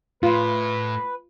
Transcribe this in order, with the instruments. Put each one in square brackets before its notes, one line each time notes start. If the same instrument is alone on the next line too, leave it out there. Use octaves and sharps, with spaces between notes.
[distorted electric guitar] A2 [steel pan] F4 [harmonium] B4